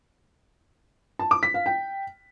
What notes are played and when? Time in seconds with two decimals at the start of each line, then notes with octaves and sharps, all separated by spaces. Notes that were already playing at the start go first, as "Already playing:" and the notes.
1.19 A5
1.31 D6
1.43 B6
1.54 F5
1.66 G5